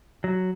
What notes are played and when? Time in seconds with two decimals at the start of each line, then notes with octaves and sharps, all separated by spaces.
0.24 F#3